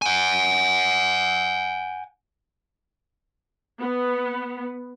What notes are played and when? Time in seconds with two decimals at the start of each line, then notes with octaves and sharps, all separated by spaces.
0.02 F#5 G#5
3.80 B3